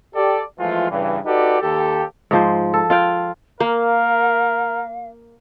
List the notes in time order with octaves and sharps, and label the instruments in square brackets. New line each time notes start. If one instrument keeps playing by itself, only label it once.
[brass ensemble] G4 A4 D5
E3 F3 G#3 A3 F4
G2 C#3 E3
D#4 F#4 G4 A4 B4 D5
D#2 G4 A4
[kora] G#2 F3 C5
A4
F4 F5 G5
[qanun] A#3 [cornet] A#4 [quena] F5